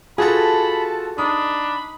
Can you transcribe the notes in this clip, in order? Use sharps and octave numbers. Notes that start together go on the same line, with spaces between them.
F4 F#4 G#4 A4 B4 A5 B5
D4 D#4 B5 D#6